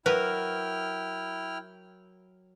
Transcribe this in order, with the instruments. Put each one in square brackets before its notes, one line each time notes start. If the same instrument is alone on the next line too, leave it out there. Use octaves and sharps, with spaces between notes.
[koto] F#3 A#4 [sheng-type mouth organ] E4 G5 F6 [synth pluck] B4